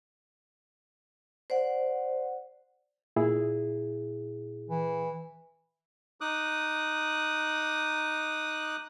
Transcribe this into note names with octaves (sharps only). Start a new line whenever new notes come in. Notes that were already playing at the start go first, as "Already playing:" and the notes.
C5 D5 F#5
A#2 E4 G#4
E3
D#4 D6 D#6 F#6